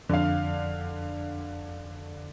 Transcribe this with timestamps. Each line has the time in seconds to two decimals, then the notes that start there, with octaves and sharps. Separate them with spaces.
0.09 F2 D3 F5